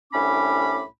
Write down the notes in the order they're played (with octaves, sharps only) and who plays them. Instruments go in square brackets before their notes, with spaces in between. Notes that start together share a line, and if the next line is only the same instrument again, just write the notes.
[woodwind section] C2 A2 C#4 D4 B5 D6